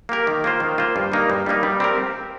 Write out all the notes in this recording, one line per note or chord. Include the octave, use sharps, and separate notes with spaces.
A#3 G4 A#4
D#3
A#3 F4 C5
D#3
A#3 F4 C5
G2
G3 A#3 D#4
G2
G3 A#3 D#4
G3
C4 G4 A#4